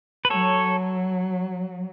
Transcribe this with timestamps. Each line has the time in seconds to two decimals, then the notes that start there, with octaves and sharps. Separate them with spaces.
0.25 B4
0.30 F#3 A4 C#5